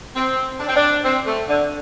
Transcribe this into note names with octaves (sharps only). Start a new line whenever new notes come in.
C4
D4
C4
D4
C4
A3
D3